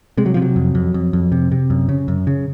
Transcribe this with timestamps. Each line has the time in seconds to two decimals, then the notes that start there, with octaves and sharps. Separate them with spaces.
0.18 C3 G#3
0.26 F#3
0.34 C3 F3
0.42 F#3
0.56 F2
0.75 F2
0.94 F2
1.13 F2
1.32 C3
1.52 C3
1.70 F#2
1.89 C#3
2.08 F#2
2.27 C#3